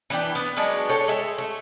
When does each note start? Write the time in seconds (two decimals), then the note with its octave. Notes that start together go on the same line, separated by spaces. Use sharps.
0.10 E3 B3 D4 G5
0.35 B3
0.57 F#3 G#3 B3 D4
0.89 A4 C#5 G5
1.08 G#3 E5
1.38 A3